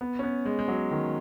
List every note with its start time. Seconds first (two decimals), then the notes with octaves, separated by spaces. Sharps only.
0.01 B3
0.19 C#4
0.23 B3
0.45 G#3
0.59 G#3
0.68 F#3
0.91 D#3